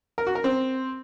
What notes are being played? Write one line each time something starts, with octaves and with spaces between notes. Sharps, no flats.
A#4
F#4
A#4
C4